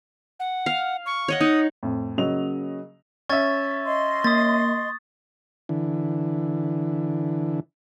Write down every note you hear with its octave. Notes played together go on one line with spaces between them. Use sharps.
F#5
F5
C#6
C#5 D#5 F#5
D#4 D#6
F2 A2
C#3 F#3 A#3 C#4 D#5 F7
C#4 E5 C#6 G#6 A6
D#5 C6
A#3 D#6 A6
D3 E3